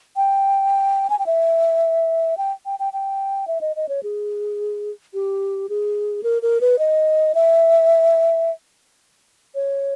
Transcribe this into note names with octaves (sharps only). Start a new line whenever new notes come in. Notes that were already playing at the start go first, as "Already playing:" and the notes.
G5
G#5
G5
E5
G5
G5
G5
G5
E5
D#5
D#5
C#5
G#4
G4
G#4
A#4
A#4
B4
D#5
E5
C#5